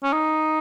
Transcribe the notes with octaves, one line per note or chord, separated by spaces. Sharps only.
C#4
D#4